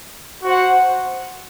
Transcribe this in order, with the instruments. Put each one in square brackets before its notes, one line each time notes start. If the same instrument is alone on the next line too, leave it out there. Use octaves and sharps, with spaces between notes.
[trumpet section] F#4 C5 F#5